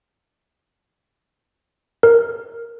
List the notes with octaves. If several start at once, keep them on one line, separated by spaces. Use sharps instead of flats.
A#4